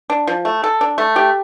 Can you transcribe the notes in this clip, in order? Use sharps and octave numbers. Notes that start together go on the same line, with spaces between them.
D4
F3
A3
A4
D4
A3
G4